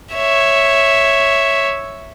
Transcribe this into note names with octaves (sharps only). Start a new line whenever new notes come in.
C#5 E5